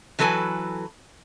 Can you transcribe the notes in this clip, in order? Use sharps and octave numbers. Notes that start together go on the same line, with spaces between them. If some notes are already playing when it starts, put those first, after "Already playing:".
E3 F#3 A4 B4 G#5